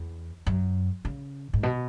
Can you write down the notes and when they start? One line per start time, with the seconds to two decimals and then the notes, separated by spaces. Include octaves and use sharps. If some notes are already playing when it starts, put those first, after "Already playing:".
Already playing: E2
0.47 F#2
1.05 C#3
1.54 G#2
1.63 B2